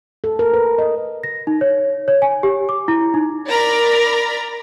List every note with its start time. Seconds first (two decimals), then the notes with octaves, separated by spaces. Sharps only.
0.24 A4
0.39 A#4
0.54 B4
0.78 D#5
1.24 A#6
1.47 D#4
1.61 C#5
2.08 C#5
2.22 G#5
2.43 G4
2.69 D6
2.88 E4
3.14 D#4
3.48 A#4 D5 A#5 B5